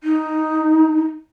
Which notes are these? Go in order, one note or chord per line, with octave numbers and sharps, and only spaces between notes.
D#4